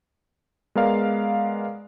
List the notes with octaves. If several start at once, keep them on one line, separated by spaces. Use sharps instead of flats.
G#3 B3 A#4 D5 F5